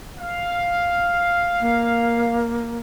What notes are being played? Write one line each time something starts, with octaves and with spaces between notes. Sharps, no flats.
F5
A#3